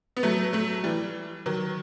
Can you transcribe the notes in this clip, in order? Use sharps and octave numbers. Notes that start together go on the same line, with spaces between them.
B3
F#3 A3
F#3 A3
E3 G3
D#3 F#3